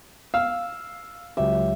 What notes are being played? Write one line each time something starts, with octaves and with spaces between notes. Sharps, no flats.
F5 E6
C#2 F#3 G4 E5